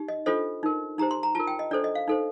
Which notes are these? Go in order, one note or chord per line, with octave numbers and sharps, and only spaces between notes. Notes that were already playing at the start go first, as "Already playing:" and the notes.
Already playing: D#4 G4
D#5
D4 F4 A4 C5 D#5
D#4 A#4
D#4 G4 C5 A#5
C6
A#5
F4 A#4 A5
G5
D#5
D4 A4 C5 D5
D#5
F5
D#4 A4 C5